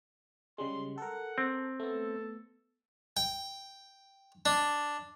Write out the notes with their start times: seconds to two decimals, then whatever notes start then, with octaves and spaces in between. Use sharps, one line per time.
0.58 C#3 G3 G#3 C6
0.98 A4 A#4 F#5
1.38 C4
1.80 A3 B3 A4
3.17 G5
4.46 D4